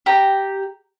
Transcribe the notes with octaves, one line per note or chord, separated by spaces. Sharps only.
G4 A#5